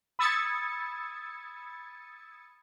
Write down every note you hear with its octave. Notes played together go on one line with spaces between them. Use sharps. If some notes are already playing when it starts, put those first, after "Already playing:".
B5 D#6 E6 G#6 A6 C#7